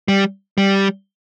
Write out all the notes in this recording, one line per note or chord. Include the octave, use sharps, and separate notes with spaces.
G3
G3